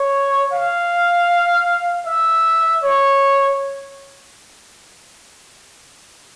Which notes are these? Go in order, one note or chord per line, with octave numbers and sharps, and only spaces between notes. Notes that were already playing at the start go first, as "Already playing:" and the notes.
Already playing: C#5
F5
E5
C#5